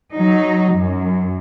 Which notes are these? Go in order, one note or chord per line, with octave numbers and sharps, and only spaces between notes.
F#3 D#4
F#2